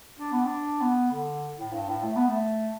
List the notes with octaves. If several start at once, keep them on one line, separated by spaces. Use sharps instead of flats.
D4
B3
D4
B3
D3
A2
G2
A2
A3
B3
A3